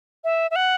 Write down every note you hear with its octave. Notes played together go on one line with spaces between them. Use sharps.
E5
E5
F#5